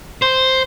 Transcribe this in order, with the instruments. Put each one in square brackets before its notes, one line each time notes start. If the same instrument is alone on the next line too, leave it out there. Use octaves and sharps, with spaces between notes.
[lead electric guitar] C5